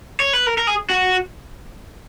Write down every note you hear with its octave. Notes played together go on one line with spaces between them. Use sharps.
C#5
B4
A#4
A#4
G#4
F#4